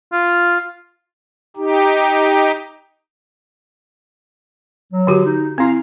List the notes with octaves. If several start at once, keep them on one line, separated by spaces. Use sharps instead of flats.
F4
D#4 G4
F#3
D3 F#4 G4
D#4
C4 E4 F5 A#5